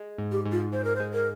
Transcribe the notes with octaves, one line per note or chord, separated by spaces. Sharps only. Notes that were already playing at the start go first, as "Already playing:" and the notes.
Already playing: G#3
G#2
G4
G#2
F4
G#2 C5
A#4
C5
G#3
A#4